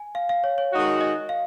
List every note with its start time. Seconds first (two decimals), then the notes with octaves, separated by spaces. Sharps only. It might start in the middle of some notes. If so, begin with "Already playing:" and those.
Already playing: G#5
0.15 F5
0.29 F5
0.44 C#5
0.58 C#5
0.72 D#3 G#3 D#4 F#4
1.01 D#5
1.29 F5